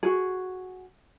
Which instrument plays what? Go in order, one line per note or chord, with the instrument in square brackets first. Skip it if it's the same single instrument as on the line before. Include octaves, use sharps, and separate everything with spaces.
[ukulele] F#4 G#4